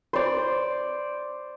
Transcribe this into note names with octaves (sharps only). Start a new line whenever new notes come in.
C5 D5